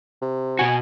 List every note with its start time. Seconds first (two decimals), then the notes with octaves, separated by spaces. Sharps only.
0.22 C3
0.59 B2 F#4 G#5